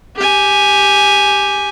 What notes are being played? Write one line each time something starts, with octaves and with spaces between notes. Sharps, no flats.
G4 G#5